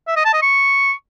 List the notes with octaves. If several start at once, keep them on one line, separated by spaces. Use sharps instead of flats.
E5
D#5
A5
D#5
C#6